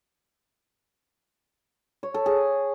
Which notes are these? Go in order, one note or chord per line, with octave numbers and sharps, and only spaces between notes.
C#5
A4
G#4